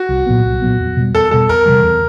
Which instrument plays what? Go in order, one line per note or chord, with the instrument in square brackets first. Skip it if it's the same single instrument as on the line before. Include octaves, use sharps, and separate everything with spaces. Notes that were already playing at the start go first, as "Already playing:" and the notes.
Already playing: [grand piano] F#4
[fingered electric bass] C2
A#2 F#3 B3
C2
A#2 F#3 B3
E2
B2 G3
[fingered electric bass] E2 [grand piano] A4
[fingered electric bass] B2 G3 [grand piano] A4
[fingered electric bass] E2 [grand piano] A#4
[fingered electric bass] C3 E3 G3
E2